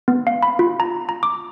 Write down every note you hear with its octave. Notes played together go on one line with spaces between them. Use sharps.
B3
F5
B5
F4
A#5
A#5
D6